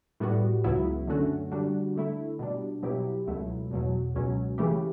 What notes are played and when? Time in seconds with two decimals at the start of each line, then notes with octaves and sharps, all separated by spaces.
0.20 A2 G3 B3 F#4
0.64 C#2 C#3 F#3 B3 E4
1.07 F#2 D3 A3 C#4 F#4
1.52 D3 G3 D4 F#4
1.96 D3 A3 E4
2.39 B2 G3 D4
2.83 B2 F#3 B3 E4 G4
3.27 C#2 B2 F#3 A3 E4
3.71 E2 B2 F#3
4.15 C#2 B2 F#3 C#4
4.58 C#3 E3 A3 E4 G4